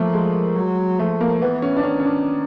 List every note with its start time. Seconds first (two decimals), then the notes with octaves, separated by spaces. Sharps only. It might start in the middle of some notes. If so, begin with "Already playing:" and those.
Already playing: F3 A3 A#3
0.13 G#3
0.56 F#3
0.99 F3 A3
1.21 A#3
1.41 E3 B3
1.62 C#4
1.77 D4
1.83 D#3 C#4
2.00 C#4
2.05 D4